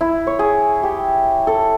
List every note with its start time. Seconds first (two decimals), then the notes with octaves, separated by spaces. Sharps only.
0.01 E4
0.27 C#5
0.39 G#4
0.83 G4
1.47 A4